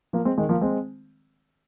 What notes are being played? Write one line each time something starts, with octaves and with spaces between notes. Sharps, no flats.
F3 A#3
G#3 C4
D#3 G#3
F3 A#3
G#3 C4